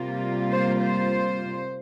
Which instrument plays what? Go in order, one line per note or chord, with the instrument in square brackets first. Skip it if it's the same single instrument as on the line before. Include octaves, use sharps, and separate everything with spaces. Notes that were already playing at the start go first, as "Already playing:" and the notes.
Already playing: [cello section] C3 G3 A#3 F4
C5
C5